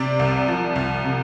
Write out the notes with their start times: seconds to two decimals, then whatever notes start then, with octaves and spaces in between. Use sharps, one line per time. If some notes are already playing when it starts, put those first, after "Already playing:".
Already playing: C3 D5
0.19 C2
0.48 F3
0.76 C2
1.05 C3